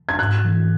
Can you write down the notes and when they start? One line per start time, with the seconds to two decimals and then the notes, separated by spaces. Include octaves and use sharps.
0.09 G#6
0.19 G#2 F#6
0.45 E3